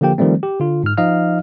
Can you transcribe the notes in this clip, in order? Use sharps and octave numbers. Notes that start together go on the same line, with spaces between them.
D3 F3 A#3 G4 G5
D#3 F3 G3 A3 C4
G4
D3 F4
G#2 F6
F3 D#4 D#5 F5 F6